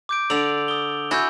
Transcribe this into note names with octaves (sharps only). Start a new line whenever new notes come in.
D6 G6 D7
D3 D5 E6 F7 F#7
D#6 G7
E4 F#4 G#5 E6 G6